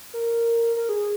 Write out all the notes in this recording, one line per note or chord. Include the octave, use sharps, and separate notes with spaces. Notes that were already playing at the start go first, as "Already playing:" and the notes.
A#4
A#4
G#4